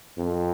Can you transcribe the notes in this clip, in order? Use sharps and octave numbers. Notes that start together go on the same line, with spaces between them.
F2